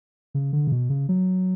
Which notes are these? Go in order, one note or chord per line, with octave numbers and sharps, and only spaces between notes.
C#3
D3
C#3
B2
C#3
F#3